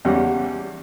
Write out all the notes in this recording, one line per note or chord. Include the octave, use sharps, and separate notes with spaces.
E2 C#3 G3 G4 C#5 F#5